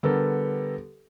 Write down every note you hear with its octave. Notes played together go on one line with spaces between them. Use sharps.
D3 G3 B3 G4 A4 A#4